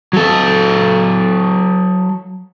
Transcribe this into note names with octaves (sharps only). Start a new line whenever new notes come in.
F#3 A4